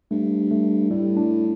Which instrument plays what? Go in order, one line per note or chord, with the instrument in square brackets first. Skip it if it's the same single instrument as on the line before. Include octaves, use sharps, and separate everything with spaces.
[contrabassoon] G2 [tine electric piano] A3
[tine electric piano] A3
[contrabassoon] A2 [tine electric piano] G3
[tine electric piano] D4